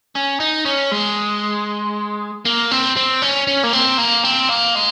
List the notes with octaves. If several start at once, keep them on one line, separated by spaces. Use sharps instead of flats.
C#4
D#4
C#4
G#3
A#3
C4
C4
C#4
C#4
A#3
C4
A#3
C4
A#3
G#3